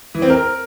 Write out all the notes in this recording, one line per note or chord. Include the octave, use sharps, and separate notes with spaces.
E3
C4
A#4